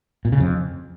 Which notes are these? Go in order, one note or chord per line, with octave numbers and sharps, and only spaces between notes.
A#2
C#3
F2